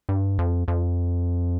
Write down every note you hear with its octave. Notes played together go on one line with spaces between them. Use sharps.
G2
F2
F2